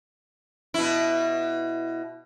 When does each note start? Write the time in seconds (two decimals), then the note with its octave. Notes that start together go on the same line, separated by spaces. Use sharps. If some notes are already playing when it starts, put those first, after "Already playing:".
0.74 B2 E4